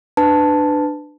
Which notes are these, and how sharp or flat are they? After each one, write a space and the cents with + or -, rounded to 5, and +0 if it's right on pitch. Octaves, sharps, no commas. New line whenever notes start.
D4 +20 B4 +20 A5 +0